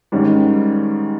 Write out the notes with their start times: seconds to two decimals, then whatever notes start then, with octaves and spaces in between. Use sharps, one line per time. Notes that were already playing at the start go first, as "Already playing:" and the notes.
0.12 G#2 D#3 G3 C#4